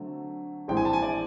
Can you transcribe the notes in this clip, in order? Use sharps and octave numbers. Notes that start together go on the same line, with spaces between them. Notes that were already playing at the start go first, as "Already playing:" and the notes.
Already playing: D3 F#3 A3 C4
A#1 A2 E3 G#3 C4 G5
G#5
A5
G#5
D5